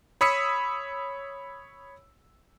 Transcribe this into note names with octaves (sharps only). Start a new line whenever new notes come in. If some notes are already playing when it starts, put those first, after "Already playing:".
C#5 B5 D#6 E6 B6 C#7